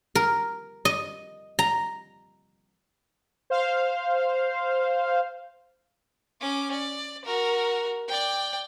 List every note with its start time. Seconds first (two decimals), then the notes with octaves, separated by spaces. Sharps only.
0.15 A#4
0.85 D#5
1.59 A#5
3.50 C5 F5
6.41 C#4 D6
6.71 D5
7.25 F#4 A#4
8.08 D5 G5